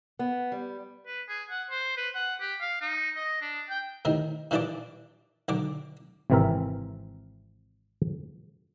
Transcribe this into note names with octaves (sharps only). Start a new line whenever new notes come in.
B3
G3
B4
G#4
F#5
C5
B4
F#5
G4
F5
D#4
D#5
D4
G5
A2 C3 D#3
G2 A#2 E3 D4 D5 D6
B1 D3 D6
G#1 C3 E3 C4 A#4 E5